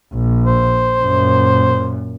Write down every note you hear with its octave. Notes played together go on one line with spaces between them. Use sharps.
A#1
C5
F#2 A#2